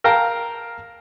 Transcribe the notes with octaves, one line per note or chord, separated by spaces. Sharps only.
A#4 F5 G5 A5 A#5